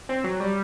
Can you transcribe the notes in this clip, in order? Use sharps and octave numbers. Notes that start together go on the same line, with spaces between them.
C4
F#3
G3